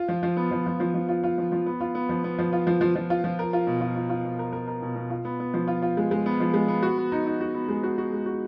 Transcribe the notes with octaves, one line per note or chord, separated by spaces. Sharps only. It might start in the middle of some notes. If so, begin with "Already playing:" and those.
Already playing: F4
F3
F3
B3
F3
F3
F3
F3
F4
F4
F3
F3
B3
F4
B3
F3
B3
F3
F4
F3
F3
F3
F4
F3
A#4
F4
B2
F4
F4
F4
B2
A#4
A#4
A#4
B2
B2
F4
B3
B3
F3
F4
F4
G#3
G#3
B3
F3
G#3
B3
F#4
B3
D#4
D#4
F#4
B3
G#3
F#4
F#4
G#3
F#4